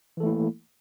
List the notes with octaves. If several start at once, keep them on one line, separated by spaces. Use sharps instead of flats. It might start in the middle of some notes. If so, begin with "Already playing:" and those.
E3 A3 A#3 E4 A4